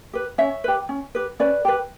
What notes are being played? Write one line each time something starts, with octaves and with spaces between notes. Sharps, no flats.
G4 B4
C#4 C#5 E5
G4 B4
C#4
G4 B4
C#4 B4 D5
G4 B4